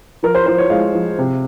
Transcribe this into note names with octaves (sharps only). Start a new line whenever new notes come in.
F3 A#4
C5
F3 C5
C#5
G#3 F5
F3
C3